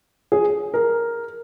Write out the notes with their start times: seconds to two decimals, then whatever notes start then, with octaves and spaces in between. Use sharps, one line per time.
0.32 G#4
0.74 A#4